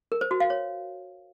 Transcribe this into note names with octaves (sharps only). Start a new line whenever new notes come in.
A#4
C5
F#4
F5
C#5